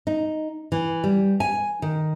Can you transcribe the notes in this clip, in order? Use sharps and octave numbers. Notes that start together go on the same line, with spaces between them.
D#4
E3
G3
G#5
D#3